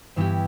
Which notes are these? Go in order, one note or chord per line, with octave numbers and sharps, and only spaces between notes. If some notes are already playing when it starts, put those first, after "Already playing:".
G2 E3 B3 E4 G4